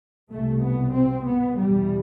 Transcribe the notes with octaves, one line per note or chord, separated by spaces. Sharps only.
C2 B2 A3
B3
C4
B3
E2 B2 G3